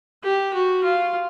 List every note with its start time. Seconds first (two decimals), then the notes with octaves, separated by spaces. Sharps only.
0.23 G4
0.53 F#4
0.84 F4